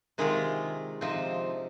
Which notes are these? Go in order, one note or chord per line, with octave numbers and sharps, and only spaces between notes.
C3 D#3 G#3 C4 F4
C3 F3 C4 D#4